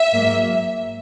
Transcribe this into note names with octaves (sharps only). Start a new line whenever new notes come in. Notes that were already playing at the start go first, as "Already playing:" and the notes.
Already playing: E5
G#2 F#3 A#3